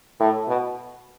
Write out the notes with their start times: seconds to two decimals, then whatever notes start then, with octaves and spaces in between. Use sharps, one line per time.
0.20 A2
0.48 B2